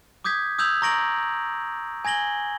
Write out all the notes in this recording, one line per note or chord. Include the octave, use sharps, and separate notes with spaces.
D6 D#6 G6 G#6 B6
D#6 E6 G6 G#6 F7 F#7
A#5 C#6 A#6 D7 F#7
G#5 G#6 A#6 F#7 G7